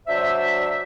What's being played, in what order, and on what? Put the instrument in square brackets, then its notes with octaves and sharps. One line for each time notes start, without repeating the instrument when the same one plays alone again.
[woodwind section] F#3 D4 C5 D5 E5